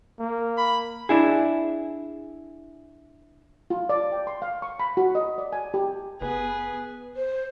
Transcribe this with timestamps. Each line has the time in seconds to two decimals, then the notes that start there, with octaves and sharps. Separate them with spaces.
0.19 A#3
0.57 B5
1.09 D4 E4 G#4
3.70 F4
3.89 D5
4.12 G5
4.27 C6
4.42 F5
4.62 C#6
4.80 B5
4.97 F#4
5.15 D#5
5.38 D5
5.53 G#5
5.74 G4
6.21 F#1 B3 G#4 B4
7.16 C5